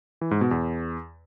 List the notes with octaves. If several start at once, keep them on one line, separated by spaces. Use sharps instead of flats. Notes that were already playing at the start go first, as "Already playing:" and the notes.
E3
G#2
B2
E2